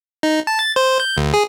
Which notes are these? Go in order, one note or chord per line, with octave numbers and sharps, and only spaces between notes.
D#4
A5
A6
C5
G6
D2
G#4